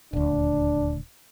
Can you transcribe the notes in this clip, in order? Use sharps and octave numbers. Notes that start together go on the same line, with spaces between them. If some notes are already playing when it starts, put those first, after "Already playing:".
D#1 D2 D4